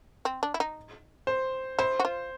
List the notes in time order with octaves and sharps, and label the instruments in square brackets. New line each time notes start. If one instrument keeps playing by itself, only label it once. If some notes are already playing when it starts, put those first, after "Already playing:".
[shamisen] C4
D4
E4
D#4
[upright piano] C5
[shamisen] E4 [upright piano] C5
[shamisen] F#4
F4